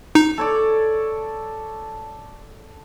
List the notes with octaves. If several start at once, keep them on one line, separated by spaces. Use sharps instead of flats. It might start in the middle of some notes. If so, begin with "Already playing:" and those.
D#4
A4 C#5 D5